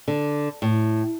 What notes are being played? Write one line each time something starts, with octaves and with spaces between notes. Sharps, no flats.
D3
A2